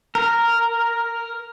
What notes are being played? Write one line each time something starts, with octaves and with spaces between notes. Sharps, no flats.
A#4